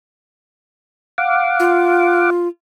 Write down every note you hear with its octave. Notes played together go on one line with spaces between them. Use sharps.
F5 F#5 D6
F4